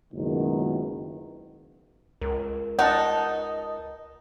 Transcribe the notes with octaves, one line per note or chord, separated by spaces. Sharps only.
F#1 C#2 B2 D#3
C#2 A#4
D#4 F#5 A5